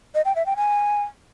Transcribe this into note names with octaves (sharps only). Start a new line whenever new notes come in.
D#5
G5
E5
G5
G#5